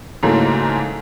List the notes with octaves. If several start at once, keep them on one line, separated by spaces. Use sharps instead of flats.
G#2 C#3 E3 F#3 A3 A#3